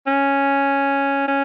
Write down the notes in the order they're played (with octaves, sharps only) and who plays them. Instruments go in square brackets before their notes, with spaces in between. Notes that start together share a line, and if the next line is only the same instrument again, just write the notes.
[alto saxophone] C#4
C#4